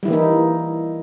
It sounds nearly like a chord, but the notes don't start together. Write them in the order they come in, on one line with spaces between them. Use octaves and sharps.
G3 E4 E3 A#3 D#4